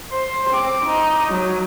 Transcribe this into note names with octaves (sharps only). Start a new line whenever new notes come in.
C5
C4 D6
D#4
F#3